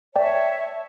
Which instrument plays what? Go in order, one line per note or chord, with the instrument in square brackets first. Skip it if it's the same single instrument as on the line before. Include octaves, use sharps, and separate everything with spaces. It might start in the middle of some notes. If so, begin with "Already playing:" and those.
[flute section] C#5 E5 A5 [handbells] D5 G5